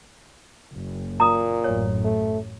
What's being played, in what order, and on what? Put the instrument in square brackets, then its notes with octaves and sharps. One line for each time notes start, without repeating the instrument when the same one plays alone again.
[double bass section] F#1
[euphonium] A#2 [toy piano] A#5 D#6
[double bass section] A1 F#2 A2 [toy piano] C#5
[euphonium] A3